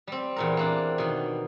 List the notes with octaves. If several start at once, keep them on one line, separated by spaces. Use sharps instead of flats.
G3 C4
E2 A#2 A#4
A#3 C4 D4
B2 D#3